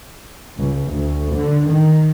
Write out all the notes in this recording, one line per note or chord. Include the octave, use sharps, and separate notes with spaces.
C#2
D2
D3
D#3